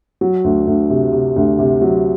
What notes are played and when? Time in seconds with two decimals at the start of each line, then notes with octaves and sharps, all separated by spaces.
0.21 F#3
0.44 D2
0.67 D2
0.90 C3
1.13 C3
1.36 D2
1.59 C3
1.82 F#3